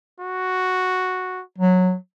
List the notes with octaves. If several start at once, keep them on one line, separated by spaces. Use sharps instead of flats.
F#4
F#3